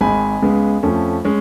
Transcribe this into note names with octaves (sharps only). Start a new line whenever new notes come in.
G#1 G#2 G#3 G#5 B5
C#2 C#3 G#3 B3
F2 F3 A3 C#4
G#3 C#4